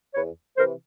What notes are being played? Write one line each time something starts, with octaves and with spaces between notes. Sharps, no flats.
E2 B4 C#5
C3 E3 A#4 C5